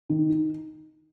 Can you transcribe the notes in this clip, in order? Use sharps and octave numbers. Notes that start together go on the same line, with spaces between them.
D#3
D#4